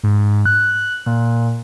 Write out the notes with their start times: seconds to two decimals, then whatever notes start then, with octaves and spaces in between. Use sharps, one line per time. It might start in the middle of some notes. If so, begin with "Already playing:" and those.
0.03 G#2
0.46 F#6
1.06 A#2